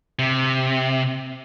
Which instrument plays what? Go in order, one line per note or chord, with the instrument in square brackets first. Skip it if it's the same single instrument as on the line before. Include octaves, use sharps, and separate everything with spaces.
[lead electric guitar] C3